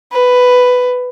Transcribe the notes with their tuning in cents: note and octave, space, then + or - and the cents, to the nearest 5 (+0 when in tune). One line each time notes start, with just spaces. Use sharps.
B4 +10